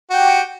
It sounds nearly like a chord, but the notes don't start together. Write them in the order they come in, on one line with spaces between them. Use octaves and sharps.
F#4 G5 G4